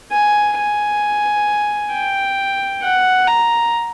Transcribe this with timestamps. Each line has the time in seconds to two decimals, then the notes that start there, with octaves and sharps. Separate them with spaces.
0.12 G#5
0.58 G#5
1.94 G5
2.83 F#5
3.28 A#5